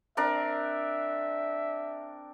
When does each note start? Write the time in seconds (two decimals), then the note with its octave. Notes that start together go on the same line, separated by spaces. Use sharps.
0.17 C4 D4 A#4 E5